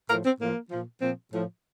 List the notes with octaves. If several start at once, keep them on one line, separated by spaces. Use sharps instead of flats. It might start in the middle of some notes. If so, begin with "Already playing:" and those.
A2 F3 A#4
C4
A2 F3 A#3
A#2 F3
A#2 F3 C4
A2 F3